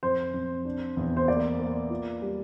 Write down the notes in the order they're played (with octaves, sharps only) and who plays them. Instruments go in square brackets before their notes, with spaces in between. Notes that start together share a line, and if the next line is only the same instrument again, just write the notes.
[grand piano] F2 [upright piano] C5
[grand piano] F2
D4
E2
[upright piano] C5
[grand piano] A#3 [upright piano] D5
[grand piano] A#3
F4
G3